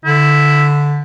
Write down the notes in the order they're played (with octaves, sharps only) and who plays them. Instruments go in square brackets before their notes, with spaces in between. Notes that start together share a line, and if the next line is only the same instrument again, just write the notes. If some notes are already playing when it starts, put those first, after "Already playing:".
[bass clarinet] D3 [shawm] E4